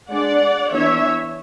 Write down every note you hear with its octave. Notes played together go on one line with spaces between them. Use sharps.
G#3 D4 D5 F#5
E3 B3 D4 C#5 E5